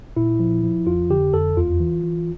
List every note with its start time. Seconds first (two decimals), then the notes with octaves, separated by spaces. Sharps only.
0.17 A#2 E4
0.40 F3
0.63 F3
0.86 F2 F4
1.10 D3 G4
1.33 F2 A4
1.57 E2 F4
1.80 E3
2.04 E3